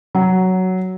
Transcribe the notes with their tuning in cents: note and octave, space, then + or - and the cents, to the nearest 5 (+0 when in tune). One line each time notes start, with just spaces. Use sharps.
F#3 +5